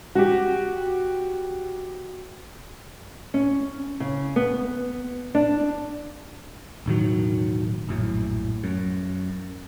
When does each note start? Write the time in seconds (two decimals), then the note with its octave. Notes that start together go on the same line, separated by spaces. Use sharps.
0.15 F#4 G4
3.34 C#4
4.00 C#3
4.36 B3
5.35 D4
6.86 E1 A2 D#3 F#3
7.89 A#1 F#2 A2
8.64 F#2